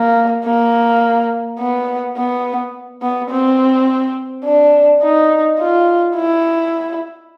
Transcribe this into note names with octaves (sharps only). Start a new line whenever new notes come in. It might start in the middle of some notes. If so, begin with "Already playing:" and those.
Already playing: A#3
A#3
B3
B3
B3
C4
D4
D#4
F4
E4